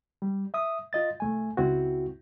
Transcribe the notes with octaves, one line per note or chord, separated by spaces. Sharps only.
G3
E5 D#6
F4 D#5 A6
C2 A3 G#5
C#2 C4 E4 F#4